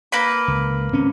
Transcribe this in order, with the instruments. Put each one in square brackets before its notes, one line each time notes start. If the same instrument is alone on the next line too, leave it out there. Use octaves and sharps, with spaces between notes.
[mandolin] A#3 B4 B5
[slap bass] C#2
G#1 C4 C#4